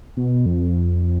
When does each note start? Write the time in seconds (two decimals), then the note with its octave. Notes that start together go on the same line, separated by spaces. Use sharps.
0.17 B2
0.46 F2